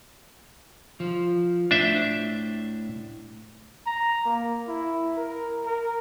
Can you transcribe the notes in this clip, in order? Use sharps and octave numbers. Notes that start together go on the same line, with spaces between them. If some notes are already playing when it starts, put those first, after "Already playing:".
F3
A2 D4 C5 E5
A#5
A#3
E4
A#4
A#4